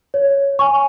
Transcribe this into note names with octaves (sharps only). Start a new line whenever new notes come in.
C#5
G#5 C#6